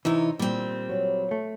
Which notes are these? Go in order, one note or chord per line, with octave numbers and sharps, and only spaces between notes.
C3 E3 D#4 E4 C#5
A#2 G3 C4
F#3
A3